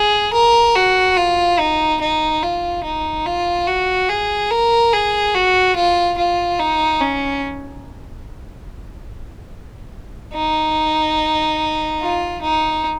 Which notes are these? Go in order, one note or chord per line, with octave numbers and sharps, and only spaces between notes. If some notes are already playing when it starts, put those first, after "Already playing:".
Already playing: G#4
A#4
F#4
F4
D#4
D#4
F4
D#4
F4
F#4
G#4
A#4
G#4
F#4
F4
F4
D#4
C#4
D#4
F4
D#4